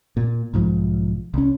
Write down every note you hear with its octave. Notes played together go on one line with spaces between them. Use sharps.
A#2
B1 G#2 F3
C2 C#4